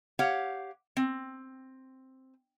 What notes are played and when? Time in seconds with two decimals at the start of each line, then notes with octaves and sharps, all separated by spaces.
0.19 G4 C#5 F5 F#5
0.97 C4